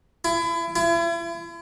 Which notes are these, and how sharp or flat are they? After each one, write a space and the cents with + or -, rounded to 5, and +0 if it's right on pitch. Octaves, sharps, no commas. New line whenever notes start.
E4 +30
E4 +40